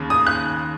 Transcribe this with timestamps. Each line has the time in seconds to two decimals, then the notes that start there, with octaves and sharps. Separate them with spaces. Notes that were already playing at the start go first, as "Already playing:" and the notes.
Already playing: D#2 C#3
0.10 D#6
0.27 F#6